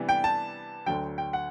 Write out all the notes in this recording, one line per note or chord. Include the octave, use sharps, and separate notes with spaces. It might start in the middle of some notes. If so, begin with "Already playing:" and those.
Already playing: C3 E3 G3 B3 D4
G5
A5
D2 D3 F#3 G5
G5
F#5